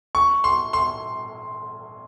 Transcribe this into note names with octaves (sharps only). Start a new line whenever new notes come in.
C#6
C6
C6